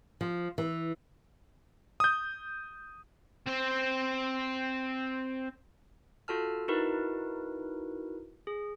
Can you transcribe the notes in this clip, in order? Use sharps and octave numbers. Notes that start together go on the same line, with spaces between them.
F3
E3
D#6 G6
C4 C5
F4 F#4 A4 A5 F6
D#4 E4 F#4 A#4 B4
G#4